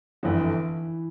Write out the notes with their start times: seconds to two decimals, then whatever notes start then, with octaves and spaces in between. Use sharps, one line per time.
0.23 G1 F2 D3 E3 E4